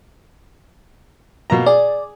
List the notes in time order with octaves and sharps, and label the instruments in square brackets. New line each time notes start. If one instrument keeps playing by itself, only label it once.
[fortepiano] B2 A#3 A#5
[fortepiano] G#4 [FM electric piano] D5